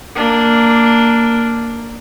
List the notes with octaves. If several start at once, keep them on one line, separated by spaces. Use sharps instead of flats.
A#3 D4